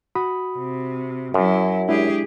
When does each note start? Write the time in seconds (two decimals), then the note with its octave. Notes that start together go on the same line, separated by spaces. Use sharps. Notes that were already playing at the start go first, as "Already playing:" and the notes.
0.15 F#4 B5 D#6
0.57 C3
1.34 F#2 F#3 E4
1.89 G#3 D4 E4 G4 G#4